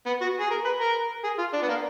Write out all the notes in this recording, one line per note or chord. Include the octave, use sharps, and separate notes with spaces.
B3
F#4
G#4
A#4
B4
A#4
G#4
F4
D4
B3
A#3